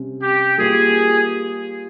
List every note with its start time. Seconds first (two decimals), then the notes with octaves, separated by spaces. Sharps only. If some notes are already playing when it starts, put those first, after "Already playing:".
Already playing: C3 G3 C#4
0.23 G4
0.58 G3 A#3 F4 G#4